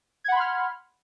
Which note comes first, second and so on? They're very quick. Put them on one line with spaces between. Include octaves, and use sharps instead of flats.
G#6 F#5 B5 C6 F6